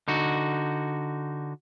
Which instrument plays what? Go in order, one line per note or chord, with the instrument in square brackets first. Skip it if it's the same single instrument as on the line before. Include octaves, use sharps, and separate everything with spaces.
[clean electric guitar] D3 D#4 F#4